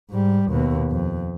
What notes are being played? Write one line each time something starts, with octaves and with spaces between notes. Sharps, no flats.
G#2 G3
D#2 B2
F2